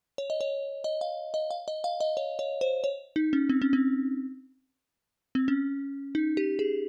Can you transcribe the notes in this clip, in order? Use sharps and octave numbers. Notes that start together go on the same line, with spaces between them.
C#5
D#5
C#5
D#5
F5
D#5
F5
D#5
F5
D#5
C#5
C#5
C5
C#5
D#4
C#4
C4
C#4
C4
C4
C#4
D#4
G4
G#4